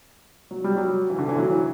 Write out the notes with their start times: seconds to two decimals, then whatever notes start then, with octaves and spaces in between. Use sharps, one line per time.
0.51 F#3
0.64 G3
0.77 F#3
1.10 E3
1.19 D3
1.29 E3
1.38 F#3
1.52 E3